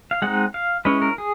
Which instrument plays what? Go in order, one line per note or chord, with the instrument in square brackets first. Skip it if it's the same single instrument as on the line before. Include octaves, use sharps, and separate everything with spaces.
[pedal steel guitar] F5
G#3 C4 D#4 F#5
F5
G#3 C#4 E4 B4
A#4
G#4